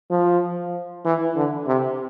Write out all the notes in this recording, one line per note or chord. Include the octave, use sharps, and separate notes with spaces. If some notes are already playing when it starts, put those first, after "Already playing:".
F3
E3
D3
C3